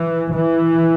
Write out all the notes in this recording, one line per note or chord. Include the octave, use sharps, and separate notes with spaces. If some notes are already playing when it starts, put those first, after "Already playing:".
Already playing: E3
E3